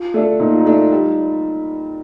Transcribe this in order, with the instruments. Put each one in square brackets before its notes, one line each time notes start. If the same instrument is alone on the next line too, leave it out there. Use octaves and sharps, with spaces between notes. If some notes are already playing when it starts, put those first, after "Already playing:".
Already playing: [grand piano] F4
[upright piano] A3 D4 A4
[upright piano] A#2 [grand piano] D#4
[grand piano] F4
D#4
[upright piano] A3 D4 A4
G3